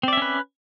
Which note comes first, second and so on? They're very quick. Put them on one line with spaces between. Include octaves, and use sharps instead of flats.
C4 D5 E5 C#4 B4